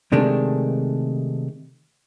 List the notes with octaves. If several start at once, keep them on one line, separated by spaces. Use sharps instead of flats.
C3 D#3 G#3 A3 D4